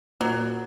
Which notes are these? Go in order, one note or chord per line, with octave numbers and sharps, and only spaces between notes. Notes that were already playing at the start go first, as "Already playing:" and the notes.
A#2 F#3 A#3